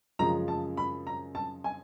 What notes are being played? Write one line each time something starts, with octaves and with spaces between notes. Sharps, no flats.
F#2 C#3 F3 G#3 A#5
A5
B5
A#5
A5
G#5